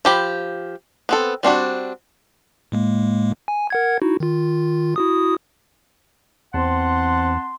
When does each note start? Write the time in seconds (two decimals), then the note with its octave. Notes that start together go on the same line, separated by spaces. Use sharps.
0.05 F3 G4 B5
1.09 B3 C4 A4
1.43 G3 C4 D4 F#4
2.72 A2 G#3 A#3
3.48 G#5
3.70 A#4 F#5 G#6
4.02 D#4 E4 F#4
4.20 D#3 F4
4.96 E4 F#4 D#6
6.54 E2 C4 F#5 A5 C6